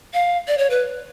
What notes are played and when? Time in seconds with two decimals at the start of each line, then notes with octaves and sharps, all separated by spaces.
0.14 F5
0.48 D5
0.58 C#5
0.70 B4